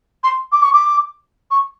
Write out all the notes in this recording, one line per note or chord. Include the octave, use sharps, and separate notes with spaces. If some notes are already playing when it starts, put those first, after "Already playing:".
C6
D6
C#6
D6
C#6